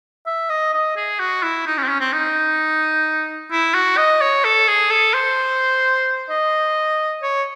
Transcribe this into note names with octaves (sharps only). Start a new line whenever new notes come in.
E5
D#5
D#5
G#4
F#4
E4
D#4
C#4
C4
C#4
C4
D#4
E4
F#4
D#5
C#5
A4
G#4
A4
C5
D#5
C#5